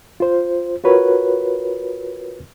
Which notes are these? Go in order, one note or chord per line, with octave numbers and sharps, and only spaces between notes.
F4 C5
F4 F#4 A#4 B4 C#5